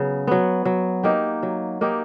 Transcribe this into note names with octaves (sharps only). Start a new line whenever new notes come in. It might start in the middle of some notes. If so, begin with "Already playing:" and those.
Already playing: C#3 F#3 B3
F#3 B3
F#3
A#3 D#4 G4
F#3
A#3 D#4 G4